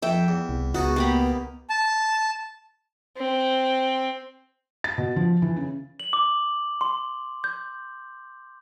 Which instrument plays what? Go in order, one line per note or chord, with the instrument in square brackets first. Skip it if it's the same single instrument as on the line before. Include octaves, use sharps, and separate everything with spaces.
[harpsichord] F2 [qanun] E5 G5
[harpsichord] E2
[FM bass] C2
[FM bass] C#2 [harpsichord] B2 D#4 A5 [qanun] F#4 [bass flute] G#4
[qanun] A#3 G4 B5 [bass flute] B3
[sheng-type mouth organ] A5
[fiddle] C4
[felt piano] A6
B2
F3
E3
C#3
[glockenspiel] F#7
D6
C6
G6